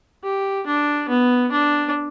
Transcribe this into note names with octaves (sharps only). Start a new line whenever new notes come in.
G4
D4
B3
D4